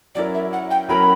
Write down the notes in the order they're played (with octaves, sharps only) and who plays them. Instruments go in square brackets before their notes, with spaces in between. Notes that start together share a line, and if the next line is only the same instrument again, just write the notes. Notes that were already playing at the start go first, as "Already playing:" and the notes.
[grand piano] F#3 C#4 E4 A#4 [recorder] D5
[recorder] E5
F#5
G5
[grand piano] F#3 C#4 E4 A#4 [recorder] B5